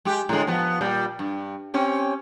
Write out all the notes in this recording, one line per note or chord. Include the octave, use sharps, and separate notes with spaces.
G#3 G4
A2 D3 G#3
F3 B3
A#2 G3
G2
C4 C#4 G4